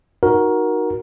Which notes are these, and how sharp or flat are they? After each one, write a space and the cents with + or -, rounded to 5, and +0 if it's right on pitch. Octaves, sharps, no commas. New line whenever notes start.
D#4 +0 F#4 +0 A#4 +15